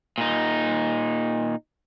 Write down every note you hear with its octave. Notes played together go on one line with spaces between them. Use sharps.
A#2 D#4